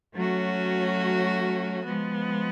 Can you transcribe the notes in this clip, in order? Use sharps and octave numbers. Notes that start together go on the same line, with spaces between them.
F#3 A3 C#4 F#4
F3 G#3 B3